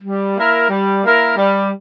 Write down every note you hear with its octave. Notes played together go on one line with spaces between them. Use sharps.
G3
A#3 E4 A#4
G3
A#3 E4 A#4
G3